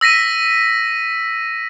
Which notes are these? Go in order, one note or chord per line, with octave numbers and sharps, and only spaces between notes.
E6 A#6 B6 D#7